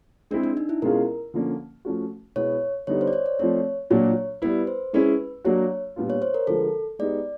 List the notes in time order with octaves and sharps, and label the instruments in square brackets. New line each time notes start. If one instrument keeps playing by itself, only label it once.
[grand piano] G#3 C4 E4 G#4 [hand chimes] D4
[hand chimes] D4
D#4
E4
[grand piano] B2 G#3 C#4 F4 G#4 [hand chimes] A#4
[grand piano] D3 F3 A#3 C#4
F3 A3 C#4 F#4
[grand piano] B2 G#3 B3 E4 [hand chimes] C#5
[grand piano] D3 G3 B3 D#4 [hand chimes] C#5
[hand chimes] C5
D5
C#5
D5
[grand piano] F3 A3 C4 [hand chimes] C#5
[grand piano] A#2 F#3 A#3 D4 [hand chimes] C#5
[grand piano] G3 B3 E4 [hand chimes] B4
[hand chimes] C5
[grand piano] G#3 C#4 E4 G#4 [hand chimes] B4
[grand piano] F#3 A#3 D4 F#4 [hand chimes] C#5
[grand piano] A#2 G3 B3 D4 F4
[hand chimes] C#5
C5
A#4
[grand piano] D3 F3 G#3 [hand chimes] A4
[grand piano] G#3 B3 D#4 G4 [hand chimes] D5